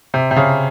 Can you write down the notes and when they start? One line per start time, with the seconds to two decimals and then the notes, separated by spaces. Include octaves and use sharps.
0.14 C3
0.31 C3
0.36 C#3